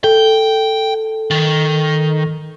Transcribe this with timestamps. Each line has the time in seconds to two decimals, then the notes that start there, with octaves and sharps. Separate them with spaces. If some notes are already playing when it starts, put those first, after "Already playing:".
0.04 A4 G5
1.31 D#3